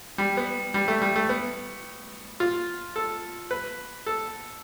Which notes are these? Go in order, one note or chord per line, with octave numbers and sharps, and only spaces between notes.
G3
B3
G3
A3
G3
A3
B3
F4
A4
B4
A4